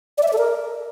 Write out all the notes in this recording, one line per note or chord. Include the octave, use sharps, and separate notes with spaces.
D5
E5
D5
A4
A#4